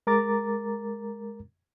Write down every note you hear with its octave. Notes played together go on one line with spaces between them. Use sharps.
G#3 A#4 A#5 D6 A6